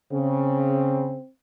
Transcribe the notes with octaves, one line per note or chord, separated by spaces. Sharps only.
C#3 C4